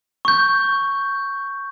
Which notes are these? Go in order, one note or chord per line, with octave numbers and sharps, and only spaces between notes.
C#6 G6